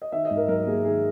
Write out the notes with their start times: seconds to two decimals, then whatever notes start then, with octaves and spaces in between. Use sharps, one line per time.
0.02 D#5
0.12 D#3 E5
0.25 D#5
0.30 G#2
0.37 A#4
0.48 F#3 A#4
0.66 A#3 G#4
0.85 D#3 G#4